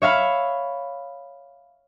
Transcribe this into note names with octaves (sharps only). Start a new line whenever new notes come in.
C#5 E5 F5 B5